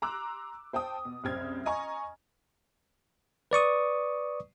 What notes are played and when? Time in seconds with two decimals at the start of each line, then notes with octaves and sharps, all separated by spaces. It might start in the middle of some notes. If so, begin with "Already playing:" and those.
0.02 A#5 C6 D6 E6 F#6
0.73 C5 G5 A5 D#6
1.05 B2
1.24 F#1 C2 C4 F6 G#6
1.66 D#5 G#5 A#5 C#6
3.51 B4 D5 C#6 D#6